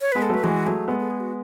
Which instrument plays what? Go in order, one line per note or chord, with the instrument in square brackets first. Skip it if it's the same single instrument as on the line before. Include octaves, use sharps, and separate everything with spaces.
[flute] C#5
[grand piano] G#3 B3 [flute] B4
[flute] A4
[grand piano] F#3 A3 [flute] B4
[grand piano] E3 G#3 [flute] F#4
[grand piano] F#3 A3 [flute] G#4
[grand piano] G#3 B3 [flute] A4
[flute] A4
G#4
F#4